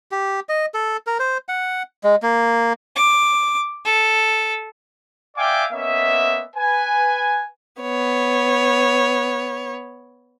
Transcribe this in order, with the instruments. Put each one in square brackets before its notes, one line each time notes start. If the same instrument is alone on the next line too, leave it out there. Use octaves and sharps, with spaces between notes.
[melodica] G4
D#5
A4
A#4
C5
F#5
G#3
A#3
[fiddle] D6
A4
[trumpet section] D5 E5 F5 G5 G#5 D6
A#3 B3 C#4 D#5 E5
B4 G#5
[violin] B3 C#5